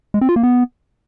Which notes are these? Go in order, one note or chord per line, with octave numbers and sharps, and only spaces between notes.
G#3
C4
F4
A#3
B3